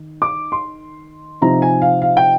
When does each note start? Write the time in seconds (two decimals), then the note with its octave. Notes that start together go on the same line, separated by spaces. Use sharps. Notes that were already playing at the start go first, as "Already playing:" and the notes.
Already playing: D#3
0.22 D6
0.52 C6
1.42 C3 F3 C4 D#4 A#5
1.62 G#5
1.82 F5
2.02 F5
2.17 G5